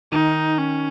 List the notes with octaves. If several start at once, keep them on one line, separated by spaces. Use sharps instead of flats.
D#3 D#4
C#4